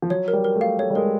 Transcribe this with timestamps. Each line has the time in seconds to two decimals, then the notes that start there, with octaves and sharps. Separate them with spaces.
0.02 F3
0.10 F#3 C#5
0.28 A#4
0.33 G3
0.44 A#4
0.56 A3
0.61 F5
0.78 A3 C#5
0.90 G3
0.95 G#3 A#4